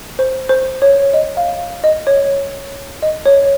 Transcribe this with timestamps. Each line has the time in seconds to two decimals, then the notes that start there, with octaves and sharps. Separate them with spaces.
0.19 C5
0.49 C5
0.82 C#5
1.14 D#5
1.37 F5
1.84 D#5
2.07 C#5
3.02 D#5
3.26 C#5